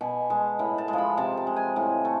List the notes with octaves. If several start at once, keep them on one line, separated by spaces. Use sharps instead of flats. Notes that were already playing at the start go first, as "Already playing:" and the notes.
B2 G#5
G#3 A5
A2 B5
A5
G#3
F3 B5
C3 A5
A5
G#3
G#5
A2
A3